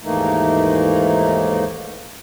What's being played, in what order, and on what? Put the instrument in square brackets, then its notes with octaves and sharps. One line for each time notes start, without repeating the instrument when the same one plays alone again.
[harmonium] D#2 G#2 E3 A3 A#3 D#4